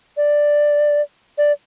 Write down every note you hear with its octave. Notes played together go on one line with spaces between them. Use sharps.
D5
D5